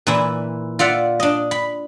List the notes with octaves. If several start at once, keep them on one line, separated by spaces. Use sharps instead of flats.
A#2 E3 E4
F4 D5 E5 F#5
D4 D#5
B5